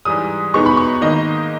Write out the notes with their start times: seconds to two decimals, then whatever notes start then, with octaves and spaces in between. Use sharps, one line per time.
0.05 G#2 E3 G3 D#6
0.54 B2 G#3 B3 D#4 C#6
0.66 B5
0.77 C#6
1.01 G#2 D#3 A#3 D#4 D#5